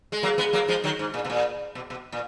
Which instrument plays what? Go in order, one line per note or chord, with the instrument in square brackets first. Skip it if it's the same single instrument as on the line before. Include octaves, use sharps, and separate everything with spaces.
[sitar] G#3
F#3 A#3
G#3 B3
F#3 A#3
F3 G#3
D#3 F#3
G#2
A#2
B2
A#2
B2
B2
A#2